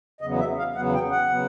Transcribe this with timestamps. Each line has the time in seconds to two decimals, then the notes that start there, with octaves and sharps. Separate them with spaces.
0.21 E2 C#3 F#3 B3 D#5
0.39 E5
0.58 F5
0.75 E2 C#3 F#3 B3 F#5
0.94 G5
1.11 F#5
1.29 C#3 F#3 B3